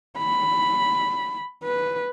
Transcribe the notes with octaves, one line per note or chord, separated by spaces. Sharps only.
B5
B4